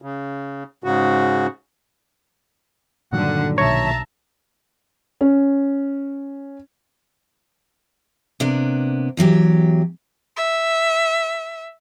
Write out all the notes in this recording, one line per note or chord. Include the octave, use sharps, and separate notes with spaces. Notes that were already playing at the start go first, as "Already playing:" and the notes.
C#3
G#2 C#3 F#4
G2 A#2 D3 D#3 F#3 F#5
B1 C#5 E5 A5 A#5
C#4
C3 A#3 B3 D4
E2 E3 F#3 G4
E5